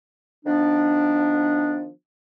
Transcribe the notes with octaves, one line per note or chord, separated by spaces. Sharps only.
D#3 F3 B3 D4